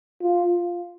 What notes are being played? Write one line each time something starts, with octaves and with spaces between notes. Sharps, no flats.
F4